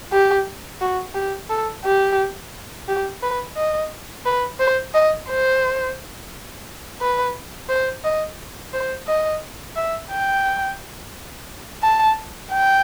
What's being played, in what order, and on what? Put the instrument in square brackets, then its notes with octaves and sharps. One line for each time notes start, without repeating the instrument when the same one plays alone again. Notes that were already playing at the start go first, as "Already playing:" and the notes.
[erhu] G4
F#4
G4
A4
G4
G4
B4
D#5
B4
C5
D#5
C5
B4
C5
D#5
C5
D#5
E5
G5
A5
G5